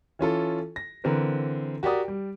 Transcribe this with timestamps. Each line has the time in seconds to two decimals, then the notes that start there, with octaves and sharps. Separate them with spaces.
0.19 E3 C#4 F4 A4
0.76 A#6
1.04 D3 E3 C4 A#4 B4
1.83 F#4 G4 A#4 D5 D#6
2.08 G3